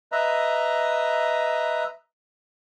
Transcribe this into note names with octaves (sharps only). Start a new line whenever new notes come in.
B4 D#5 E5 A#5